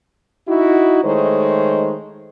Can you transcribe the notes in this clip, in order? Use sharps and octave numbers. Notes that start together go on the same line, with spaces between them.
D#4 E4 F#4
D#3 G#3 A3 D#4 C5 C#5